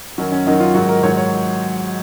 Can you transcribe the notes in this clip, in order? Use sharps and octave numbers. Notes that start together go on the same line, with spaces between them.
F#2 D#3 F#3 C#4
C#4
F#2 D#3 F#3 D#4
F4
G#2 D#3 F#3 F#4
A#4
G#2 D#3 F#3 C#5
C#5